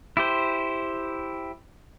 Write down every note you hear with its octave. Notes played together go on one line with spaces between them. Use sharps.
E4 G4 C5